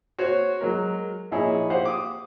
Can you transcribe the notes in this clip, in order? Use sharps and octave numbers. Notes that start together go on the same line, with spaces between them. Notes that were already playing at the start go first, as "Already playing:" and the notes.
F#4 C5 C#5
F#3 G#3 A#4
A#1 D#4 E4 G#4 C#5
G4 C5 F5 F#5
D6 D#6